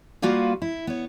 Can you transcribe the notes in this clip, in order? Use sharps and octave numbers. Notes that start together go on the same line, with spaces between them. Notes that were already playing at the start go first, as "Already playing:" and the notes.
G3 A#3 F4 F#4 B4 F5
E4
B3 C#5